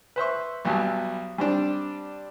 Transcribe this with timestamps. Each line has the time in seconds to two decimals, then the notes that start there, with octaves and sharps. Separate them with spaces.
0.16 B4 C5 E5 C#6
0.65 B1 F#3 G3 G#5 A5
1.38 G3 C4 D4